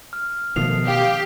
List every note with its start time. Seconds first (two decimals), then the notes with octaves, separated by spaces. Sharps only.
0.13 F6
0.56 B2 D#3 F3 A3 D#6 C7 F7
0.87 G4 F5